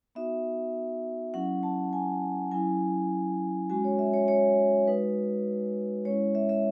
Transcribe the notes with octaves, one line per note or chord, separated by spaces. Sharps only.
B3 D#4 F#4 E5
F#3 C#4 E4 F#5
A5
G#5
F#3 C#4 E4 G#5
G#3 C#4 F#4 G#5
C#5
E5
C#5
C#5
G#3 D#4 F#4 B4
G#3 C#4 E4 C#5
E5
E5